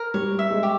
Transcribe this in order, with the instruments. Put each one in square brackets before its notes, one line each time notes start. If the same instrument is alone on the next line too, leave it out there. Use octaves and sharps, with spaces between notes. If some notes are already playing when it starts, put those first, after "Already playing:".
Already playing: [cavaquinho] A#4
[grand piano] G3 [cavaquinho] C#5
[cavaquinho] E5
[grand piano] G#3
[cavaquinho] G4